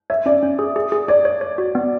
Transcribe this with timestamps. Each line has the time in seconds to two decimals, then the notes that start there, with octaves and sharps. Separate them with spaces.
0.10 C#5 E5
0.26 C#4 D5
0.43 C#4
0.59 G#4
0.76 G#4
0.92 G#4
1.08 C#5 D5
1.25 C#5
1.41 C#5
1.58 F#4
1.75 B3